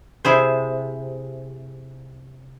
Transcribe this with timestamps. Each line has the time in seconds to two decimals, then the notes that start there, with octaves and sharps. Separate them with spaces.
0.25 C3 E4 G#4 C5